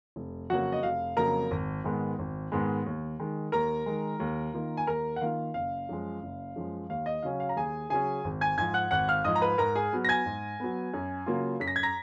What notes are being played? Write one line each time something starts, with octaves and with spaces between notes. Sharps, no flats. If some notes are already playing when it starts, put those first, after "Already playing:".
F1
F2 C#3 F#3 A#3 F#4 F#5
D#5
F1 F5
F2 C#3 F#3 A#3 A#4 A#5
G#1
G#2 D#3 G#3 B3
G#1
G#2 D#3 G#3 B3
D#2
D#3 G#3
D#2 A#4 A#5
D#3 G#3
D#2
D#3 A#3 F4
G#5
D#2 A#4 A#5
F#5
D#3 A#3 F4 F5
F#1 F5
F#2 F3 G#3
F#1
F#2 F3 G#3
D#2 F5
D#5
C#3 F#3 C#4 F5
F5
A#5
D#2 G#4 G#5
C#3 F#3 C#4 G#4 G#5
G#1
G#5 G#6
G#2 F3 G#5 G#6
F#5 F#6
G#1 F#5 F#6
F5 F6
G#2 F3 D#5 D#6
A#5
B4 B5
G#2 A#4 A#5
G#4 G#5
F#3 B3
A#6
G#5 G#6
G#2
F#3 B3
F#2
C#3 F#3 A#3 F4
F#2 B6
A#6
G#6
A#5 A#6